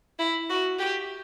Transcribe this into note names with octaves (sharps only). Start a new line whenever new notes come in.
E4
F#4
G4